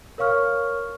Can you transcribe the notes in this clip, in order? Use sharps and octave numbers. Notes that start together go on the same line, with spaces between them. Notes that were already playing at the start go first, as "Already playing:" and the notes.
A#4 C#5 F5 C#6 F6